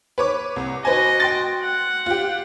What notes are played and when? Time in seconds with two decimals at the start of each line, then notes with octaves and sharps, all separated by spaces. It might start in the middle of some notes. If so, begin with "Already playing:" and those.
0.18 B4 C#5 D6
0.56 C2
0.85 F#4 B4 C5 D#5 G#5
1.20 G5 C6 A6
1.63 F#5
2.06 F4 G4